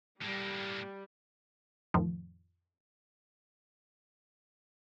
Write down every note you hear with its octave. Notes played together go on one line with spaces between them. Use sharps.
A2 G3 A#3
F2 A2 D#3 F3